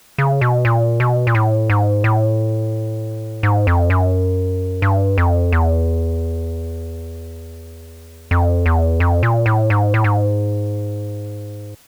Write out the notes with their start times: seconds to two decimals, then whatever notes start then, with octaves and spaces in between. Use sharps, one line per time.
0.18 C#3
0.41 B2
0.65 A#2
1.00 B2
1.27 A#2
1.35 A2
1.70 G#2
2.04 A2
3.43 G#2
3.67 F2
3.90 F#2
4.82 G2
5.18 F2
5.52 E2
8.31 F2
8.66 E2
9.00 F2
9.23 A#2
9.46 A2
9.70 G#2
9.94 A2
10.04 G#2